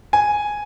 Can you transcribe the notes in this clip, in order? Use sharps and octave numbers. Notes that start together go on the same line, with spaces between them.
G#5